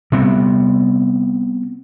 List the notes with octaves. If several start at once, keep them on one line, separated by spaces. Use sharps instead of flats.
C3 G3 B3 C4